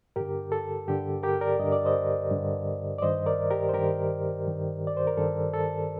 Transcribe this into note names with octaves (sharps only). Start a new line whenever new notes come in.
G2 D3 G4 A#4
A4
G2 D3 G4
G4 A#4
A#4 D5
G2 D3 D#5
D5
C5 D#5
G2 D3
D5
G2 D#3 C5 D#5
A#4 D5
G4 A#4
C5
G2 D#3 G4 A#4
G2 D#3
D5
C5
A#4
G2 D#3 A4
A4